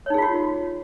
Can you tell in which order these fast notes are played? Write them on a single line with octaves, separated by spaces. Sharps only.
C#5 D#4 G#4 F4 F#4